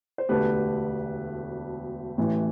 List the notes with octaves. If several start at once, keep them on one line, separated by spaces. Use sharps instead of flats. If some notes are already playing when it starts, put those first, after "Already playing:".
C5
E1 D2 D3 A3 G4 B4
A1 A2 E3